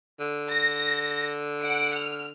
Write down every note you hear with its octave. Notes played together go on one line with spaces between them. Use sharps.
D3
A#6
F#5 D7
F6